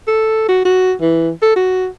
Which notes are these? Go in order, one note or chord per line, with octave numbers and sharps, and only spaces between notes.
A4
F#4
F#4
E3
A4
F#4